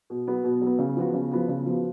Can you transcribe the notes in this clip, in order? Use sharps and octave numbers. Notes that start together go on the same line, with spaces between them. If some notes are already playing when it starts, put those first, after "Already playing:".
B2
F#3 B3
B2
F#3 B3
C#3
F3 B3 F#4
C#3
F3 B3 F#4
C#3
F3 B3 F#4